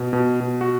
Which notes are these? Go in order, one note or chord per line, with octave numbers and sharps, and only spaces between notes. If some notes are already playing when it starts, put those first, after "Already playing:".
Already playing: B2
B2
B2
F#4